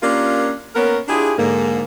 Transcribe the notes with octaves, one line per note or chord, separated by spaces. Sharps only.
A#3 C#4 D4 F4 G4 A#4
A#3 B3 C#4 A#4
D4 E4 F4 G4 G#4
G#2 D3 A#3